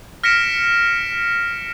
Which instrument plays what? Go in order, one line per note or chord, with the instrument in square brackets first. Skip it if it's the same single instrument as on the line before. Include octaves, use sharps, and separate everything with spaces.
[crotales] F6 A#6 B6 C#7 D7 E7